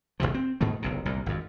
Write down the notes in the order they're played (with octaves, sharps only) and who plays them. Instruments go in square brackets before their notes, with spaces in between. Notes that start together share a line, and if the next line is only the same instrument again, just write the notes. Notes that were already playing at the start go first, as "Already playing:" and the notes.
[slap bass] G#1 D2 C3 F3
C4
G#2 B2 D#3 A3
F#1 B1 C3
C2 A#2
G#1 F2